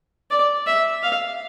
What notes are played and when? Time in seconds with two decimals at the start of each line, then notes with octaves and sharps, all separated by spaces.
0.31 D5
0.67 E5
1.03 F5